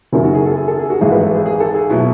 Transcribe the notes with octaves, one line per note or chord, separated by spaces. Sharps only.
F#1 F#2 D#3 F#3 E4
F#4
G#4
A4
G#4
A4
G#4
F#4
G#1 G#2 E3 G#3 G#4
B4
A4
G#4
G#4
A4
G#4
B2 F#3 E4